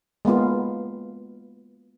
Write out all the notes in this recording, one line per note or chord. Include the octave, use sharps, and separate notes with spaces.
G#3 A#3 B3 F4